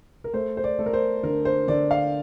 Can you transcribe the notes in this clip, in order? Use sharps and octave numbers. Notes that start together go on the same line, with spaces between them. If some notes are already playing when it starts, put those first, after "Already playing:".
A#4
A3 C5
C5
D5
A3 A4
A#4
C5
D3 A#4
C5
D3 D5
F5